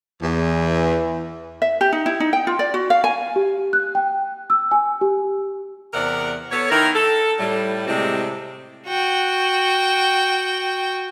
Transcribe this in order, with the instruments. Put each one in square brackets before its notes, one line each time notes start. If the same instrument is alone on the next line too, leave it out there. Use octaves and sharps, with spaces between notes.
[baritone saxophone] E2 [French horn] E3
[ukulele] E5
G4
D#4
E4
D#4
G5
F4
D5
F#4
F5
G#5
[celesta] G4
F#6
G5
E6
G#5
G4
[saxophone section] E2 C3 A#4 D5 F#5
B3 A4 C#5
D#3 E4 A#4
A4
A2 G3
A2 C3 G3 G#3 C4
[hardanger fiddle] F#4 G5